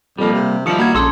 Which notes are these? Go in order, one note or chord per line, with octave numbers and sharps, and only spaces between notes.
F2 G3 A#3
C3
D#3 F3 G3 E4 D#6 C#7
A#3 F#4 A#5 G#6
A#1 C#3 A4 C6 D6 E6